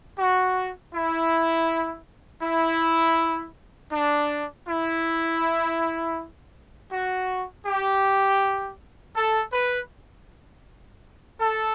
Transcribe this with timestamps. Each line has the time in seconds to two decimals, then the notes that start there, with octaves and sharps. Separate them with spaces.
0.18 F#4
0.93 E4
2.43 E4
3.92 D4
4.67 E4
6.91 F#4
7.66 G4
9.16 A4
9.53 B4
11.39 A4